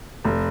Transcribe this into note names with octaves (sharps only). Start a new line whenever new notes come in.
F1